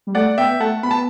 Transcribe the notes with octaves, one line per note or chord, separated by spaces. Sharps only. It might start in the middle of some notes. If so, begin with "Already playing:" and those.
G3
A3 D5 F#5
B3 E5 G5
A3 F#5 A5
B3 B5
A5